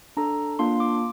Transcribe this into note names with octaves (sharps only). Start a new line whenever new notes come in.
D4 A4 A#5
A#3 D4 F4 C6
D6